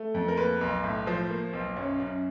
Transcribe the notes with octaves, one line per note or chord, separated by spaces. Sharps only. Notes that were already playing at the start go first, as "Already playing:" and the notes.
Already playing: A3
F2
A#4
A#3 B4
B1
A2
F3 C5
A#3
B1
F#2 C#5
F#2